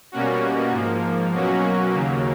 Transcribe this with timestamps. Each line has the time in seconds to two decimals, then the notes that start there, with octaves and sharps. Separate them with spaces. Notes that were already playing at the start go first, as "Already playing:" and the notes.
0.12 B2 G3 A#3 C#4 F#4
0.72 G#2 F3 A#3
1.32 B2 F#3 A#3 C#4 F#4
1.92 D#2 C#3 F#3 A#3